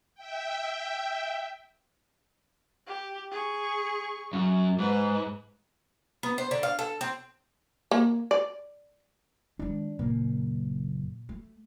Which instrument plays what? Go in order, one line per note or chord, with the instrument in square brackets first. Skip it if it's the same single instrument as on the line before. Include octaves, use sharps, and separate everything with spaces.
[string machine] E5 G5
[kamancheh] G4
G#4 C#6
[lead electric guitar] F#2
[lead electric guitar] G#2 [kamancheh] B4
[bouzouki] B3
C5
D3
F5
A4
C4
[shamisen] A#3
D5
[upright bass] D#3 G#3 [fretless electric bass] D4
[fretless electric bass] F#1 A#3 [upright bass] A#2
[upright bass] A3